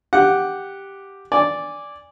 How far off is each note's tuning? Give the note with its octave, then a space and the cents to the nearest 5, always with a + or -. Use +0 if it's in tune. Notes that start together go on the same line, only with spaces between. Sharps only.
G4 +0 F#5 +0
D5 -5 G#5 -15